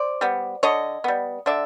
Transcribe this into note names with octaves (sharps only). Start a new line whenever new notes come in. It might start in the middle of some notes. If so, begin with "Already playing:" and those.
Already playing: C5 D5
G3 B3
D3 C#5 D#5
G3 B3
D3 D5 E5